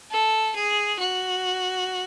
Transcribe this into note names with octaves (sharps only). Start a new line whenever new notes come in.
A4
G#4
F#4